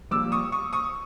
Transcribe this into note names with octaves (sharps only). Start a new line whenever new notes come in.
A#1 A#2 G3 D6 E6
C#6 D#6
C#6 D#6
C#6 D#6